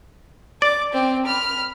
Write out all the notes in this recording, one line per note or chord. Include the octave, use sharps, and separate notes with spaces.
D5 D6
C4 G5
B5 F6